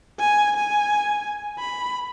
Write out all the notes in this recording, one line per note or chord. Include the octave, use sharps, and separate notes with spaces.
G#5
G#5
B5